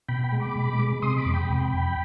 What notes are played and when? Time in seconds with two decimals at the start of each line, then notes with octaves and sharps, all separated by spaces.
0.09 B2 G5 B5
0.24 G5 B5
0.32 G#3
0.40 B5 D6
0.55 B2
0.79 G#3
1.02 C3 C6 D#6
1.18 B5 D6
1.25 F2
1.34 G5 B5
1.49 C3
1.73 F2